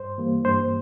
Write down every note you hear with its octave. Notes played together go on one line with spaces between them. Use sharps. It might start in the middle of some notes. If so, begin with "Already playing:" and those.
Already playing: G2 C5
E3 G3 A#3
G2 C5